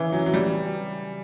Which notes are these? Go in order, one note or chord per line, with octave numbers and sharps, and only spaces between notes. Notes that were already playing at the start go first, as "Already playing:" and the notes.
Already playing: C#3 E3
F#3
F#3
G3